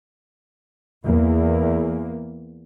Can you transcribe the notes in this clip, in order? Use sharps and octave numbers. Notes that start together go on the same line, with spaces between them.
E2 A#3